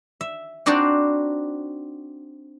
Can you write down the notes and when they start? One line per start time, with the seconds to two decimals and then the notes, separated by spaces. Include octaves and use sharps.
0.21 E5
0.66 C4 D4 D#4 F#4 C5 D5